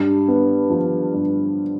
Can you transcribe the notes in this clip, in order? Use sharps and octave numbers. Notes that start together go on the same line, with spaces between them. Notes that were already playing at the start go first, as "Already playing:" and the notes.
Already playing: G2
B3
F3
G2